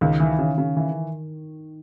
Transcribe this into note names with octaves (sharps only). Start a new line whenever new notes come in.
C#2 D#3
E3
C#3
C#3
E3